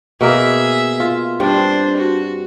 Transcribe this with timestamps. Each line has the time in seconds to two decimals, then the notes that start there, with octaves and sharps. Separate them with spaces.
0.21 B2 A#3 G#4 A#4 E5
1.00 F4
1.40 G2 C4 D4 C5
1.96 F#4